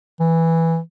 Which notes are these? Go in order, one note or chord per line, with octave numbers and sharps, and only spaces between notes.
E3